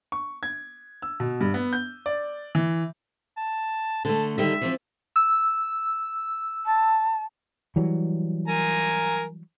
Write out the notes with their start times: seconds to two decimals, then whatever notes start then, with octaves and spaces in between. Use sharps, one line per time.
0.12 C#6
0.43 G#6
1.02 E6
1.20 B2
1.41 G2
1.54 B3
1.73 G6
2.06 D5
2.55 E3
3.37 A5
4.05 D3 A3 A5
4.38 D3 D#3 G3 E5
4.61 E3 F3 C4
5.16 E6
6.66 A5
7.76 E3 F#3 G3
8.48 A#4 G#5 A#5